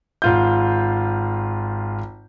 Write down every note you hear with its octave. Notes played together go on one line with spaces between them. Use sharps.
G#1 F4 G6